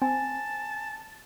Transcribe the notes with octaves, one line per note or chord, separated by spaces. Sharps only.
C4 G#5 A5